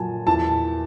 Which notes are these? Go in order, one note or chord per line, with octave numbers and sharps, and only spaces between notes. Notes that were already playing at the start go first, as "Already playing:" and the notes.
Already playing: A#2 F#3 G#5 A5
E2 A5